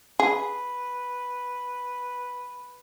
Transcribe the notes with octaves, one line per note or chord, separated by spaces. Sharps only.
G#4 B4